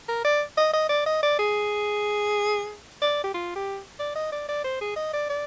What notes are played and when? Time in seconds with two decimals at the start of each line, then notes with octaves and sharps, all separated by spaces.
0.08 A#4
0.25 D5
0.57 D#5
0.73 D#5
0.89 D5
1.06 D#5
1.23 D5
1.39 G#4
3.02 D5
3.24 G4
3.34 F4
3.55 G4
3.99 D5
4.15 D#5
4.32 D5
4.48 D5
4.64 C5
4.81 G#4
4.96 D#5
5.13 D5
5.29 D5